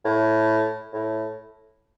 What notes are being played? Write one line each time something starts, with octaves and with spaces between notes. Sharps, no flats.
A2
A2